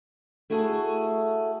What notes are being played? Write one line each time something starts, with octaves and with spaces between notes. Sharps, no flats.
A3 E4 F#4 G#4 A4